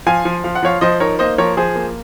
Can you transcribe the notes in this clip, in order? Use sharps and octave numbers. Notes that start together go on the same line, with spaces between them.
F3 F5 G#5
F3
F3 F5
F#5
F3 C#5 F5
F3 C5 D#5
D#4 A#4 C#5
A#3 C5 D#5
F3 A#4 C#5
F3 G#4 C5
A#3